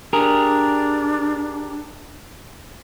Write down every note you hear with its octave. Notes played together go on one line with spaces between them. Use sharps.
D4 G4 G#4 A#4